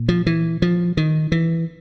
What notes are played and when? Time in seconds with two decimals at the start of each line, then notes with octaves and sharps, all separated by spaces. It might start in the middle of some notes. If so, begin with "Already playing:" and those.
Already playing: A#2
0.09 F3
0.27 E3
0.62 F3
0.97 D#3
1.32 E3